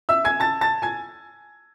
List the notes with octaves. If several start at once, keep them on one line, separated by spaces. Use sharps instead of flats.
E5 E6
G#5 G#6
A5 A6
A5 A6
G#5 G#6